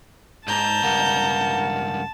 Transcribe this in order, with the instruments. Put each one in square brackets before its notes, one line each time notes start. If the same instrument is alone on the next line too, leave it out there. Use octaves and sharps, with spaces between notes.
[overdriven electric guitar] G#2 [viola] A5 [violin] A#5 G6
[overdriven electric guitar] C#2 G2 [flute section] A#4 F5 F#5